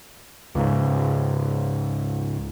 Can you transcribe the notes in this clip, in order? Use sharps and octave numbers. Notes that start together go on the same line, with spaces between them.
C#2 G#2